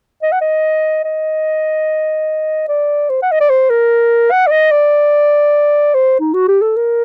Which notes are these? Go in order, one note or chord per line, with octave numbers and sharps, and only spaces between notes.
D#5
F#5
D#5
D#5
D5
C5
F#5
D#5
D5
C5
A#4
F#5
D5
D#5
D5
C5
D#4
F#4
G4
A4
A#4